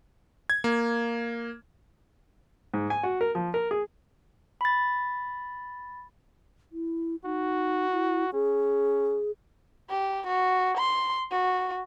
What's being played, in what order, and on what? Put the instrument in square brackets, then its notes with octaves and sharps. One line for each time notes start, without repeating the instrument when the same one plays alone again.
[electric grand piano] G#6
A#3
[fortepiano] G#2
G#5
F#4
A#4
F3
A#4
G#4
[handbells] B5 A6
[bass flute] E4
[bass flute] D#4 [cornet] F#4
[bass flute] E4
[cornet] C#4 [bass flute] G#4
[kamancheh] G4
F#4
C6
F#4